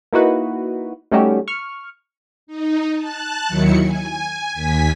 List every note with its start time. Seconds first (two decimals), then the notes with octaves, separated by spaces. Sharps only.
0.13 A#3 D#4 E4 F#4 B4
1.11 G3 A3 C#4 D#4 F#4 G4
1.48 C#6 F6
2.47 D#4
2.96 A5 F#6
3.47 D#2 D#3 F#3 E4 C#7
3.82 G#5
4.54 D#2 G#5 B6